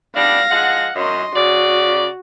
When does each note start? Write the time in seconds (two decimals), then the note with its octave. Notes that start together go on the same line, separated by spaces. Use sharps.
0.15 G3 B3 D4 F5 A#6
0.51 F3 G#3 F#5
0.96 F#2 D#5 C6
1.35 C#3 F#4 D5